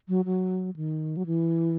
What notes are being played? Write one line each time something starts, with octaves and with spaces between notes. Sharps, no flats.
F#3
F#3
D#3
F#3
E3